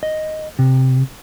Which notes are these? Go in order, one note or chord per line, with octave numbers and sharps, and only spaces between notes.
D#5
C3